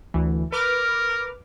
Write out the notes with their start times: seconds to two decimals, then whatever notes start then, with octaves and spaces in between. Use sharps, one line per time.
0.14 D2 E3
0.52 A#4 B4 D6 F6